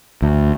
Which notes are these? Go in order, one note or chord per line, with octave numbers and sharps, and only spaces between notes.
D2